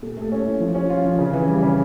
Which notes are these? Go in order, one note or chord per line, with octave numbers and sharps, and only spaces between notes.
A#2 A4
A3
A4
C#4
E4 A4
F3
C#4
F4
F3
C#3
E3
G3
C#3